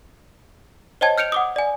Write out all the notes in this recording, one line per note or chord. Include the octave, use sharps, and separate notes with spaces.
C5 C#5 D#5 G5 A5 G#6
F6 G6 C#7 D7 F7
F#5 D6 D#6
D5 G#5